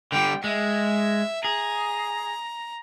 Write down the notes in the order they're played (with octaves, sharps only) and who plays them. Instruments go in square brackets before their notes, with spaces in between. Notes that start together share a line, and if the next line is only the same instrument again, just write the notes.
[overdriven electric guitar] D3 G3 [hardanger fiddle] G5
[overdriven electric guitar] G#3 [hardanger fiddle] E5
[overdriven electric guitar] G#4 [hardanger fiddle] A#5